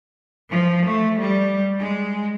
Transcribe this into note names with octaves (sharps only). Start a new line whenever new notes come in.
F3
A3
G3
G#3